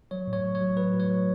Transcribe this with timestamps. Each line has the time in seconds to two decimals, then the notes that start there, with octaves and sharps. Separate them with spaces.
0.11 F#3 C#5
0.27 A2
0.33 C#5
0.44 F#3
0.55 C#5
0.60 F#3
0.77 F#3 B4
0.94 A2
1.00 C#5
1.10 F#3